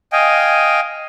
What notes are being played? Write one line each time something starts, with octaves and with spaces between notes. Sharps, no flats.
D#5 F5 G5 G#5